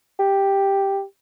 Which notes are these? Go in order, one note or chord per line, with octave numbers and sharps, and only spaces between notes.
G4